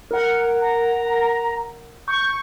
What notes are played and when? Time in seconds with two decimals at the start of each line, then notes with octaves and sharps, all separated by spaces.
0.11 A#4 F#5
0.61 A#5
2.08 C#6 G6